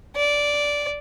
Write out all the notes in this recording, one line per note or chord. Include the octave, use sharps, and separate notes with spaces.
D5